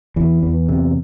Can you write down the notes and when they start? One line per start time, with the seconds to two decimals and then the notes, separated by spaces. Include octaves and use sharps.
0.16 E2 E3
0.42 E2
0.69 C3